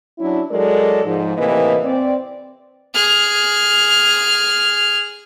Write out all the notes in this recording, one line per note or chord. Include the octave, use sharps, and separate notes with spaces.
F#3 C#4 D4 E4
F#3 G#3 A4 A#4 D5
G#2 F3
A2 C3 E3 A#3 B4 D#5
C4 D5
G#4 F6